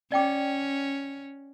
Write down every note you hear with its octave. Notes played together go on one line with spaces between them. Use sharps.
C#4 D5 G5 D6